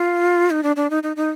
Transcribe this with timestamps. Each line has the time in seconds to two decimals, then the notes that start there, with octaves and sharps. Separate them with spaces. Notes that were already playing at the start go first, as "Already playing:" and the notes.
Already playing: F4
0.50 D#4
0.63 D4
0.76 D4
0.90 D#4
1.03 D#4
1.16 D#4